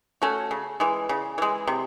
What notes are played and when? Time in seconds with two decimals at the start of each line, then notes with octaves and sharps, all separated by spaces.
0.22 A3 C#4 F#4
0.51 C#3
0.80 E3 G#3
1.09 C#3
1.38 E3 G#3
1.67 C3